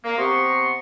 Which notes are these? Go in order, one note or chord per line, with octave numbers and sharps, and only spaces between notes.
A#3
C3 B3 G4 A#5 C6 C#6